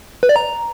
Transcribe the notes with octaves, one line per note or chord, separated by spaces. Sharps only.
B4
D5
A#5